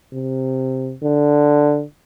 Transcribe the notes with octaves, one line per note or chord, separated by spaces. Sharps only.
C3
D3